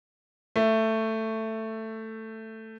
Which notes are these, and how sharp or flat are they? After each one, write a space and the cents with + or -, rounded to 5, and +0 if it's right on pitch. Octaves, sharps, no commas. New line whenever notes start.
A3 +10